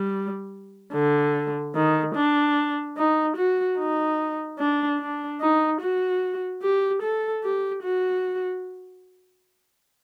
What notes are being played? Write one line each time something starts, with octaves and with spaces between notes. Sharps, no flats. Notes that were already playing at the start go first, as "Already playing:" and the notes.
Already playing: G3
D3
D#3
D4
D#4
F#4
D#4
D4
D4
D#4
F#4
G4
A4
G4
F#4